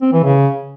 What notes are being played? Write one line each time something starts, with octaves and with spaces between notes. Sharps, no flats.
C4
E3
C#3